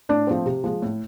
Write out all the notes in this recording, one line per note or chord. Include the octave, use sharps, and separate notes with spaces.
A2 D4 D5
F3 A3 C4
C3
F3 G#3
A2